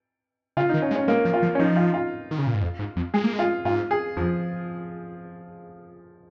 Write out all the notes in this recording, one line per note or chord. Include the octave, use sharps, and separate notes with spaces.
C#3 F4
D#3 D#4
C#4
G#3
C#4
G#3 A#3
F3
F4
F3
C#4
F3 D#4
F4
F4
D#3
C#3
A#2
G#2
F2
G#2
F2
G#3 G#4
A#3
G#3
F4
G#2 F4
G#4
F2 F3